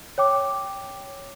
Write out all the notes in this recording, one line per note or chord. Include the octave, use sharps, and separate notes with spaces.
C#5 G5 D6